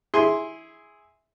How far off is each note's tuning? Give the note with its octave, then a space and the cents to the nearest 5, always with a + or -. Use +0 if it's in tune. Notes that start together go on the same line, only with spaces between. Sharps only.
E4 -10 G#4 +0 C6 +0